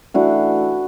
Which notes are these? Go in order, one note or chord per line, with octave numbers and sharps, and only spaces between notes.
E3 A3 D4 F#4